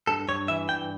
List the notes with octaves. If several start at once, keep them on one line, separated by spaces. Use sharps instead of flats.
G2 A4
G2 C#5
E3 E5
G2 G5